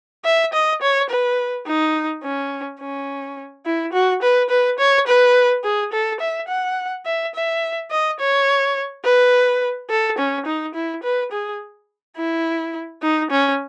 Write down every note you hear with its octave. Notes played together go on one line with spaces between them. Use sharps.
E5
D#5
C#5
B4
D#4
C#4
C#4
E4
F#4
B4
B4
C#5
B4
G#4
A4
E5
F#5
E5
E5
D#5
C#5
B4
A4
C#4
D#4
E4
B4
G#4
E4
D#4
C#4